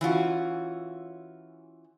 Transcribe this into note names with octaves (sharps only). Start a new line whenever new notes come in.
E3 C#4 F4 F#4